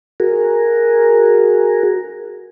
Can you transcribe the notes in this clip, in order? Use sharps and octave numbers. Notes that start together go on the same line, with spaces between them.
F#4 G#4 A#4